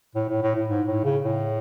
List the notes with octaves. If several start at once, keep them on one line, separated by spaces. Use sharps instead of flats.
A2
A2
A2
A2
G#2
A2
C#3
A2